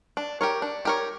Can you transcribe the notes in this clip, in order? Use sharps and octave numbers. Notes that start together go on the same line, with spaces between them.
D4
G4 A#4 C#5
D4
G4 A#4 C#5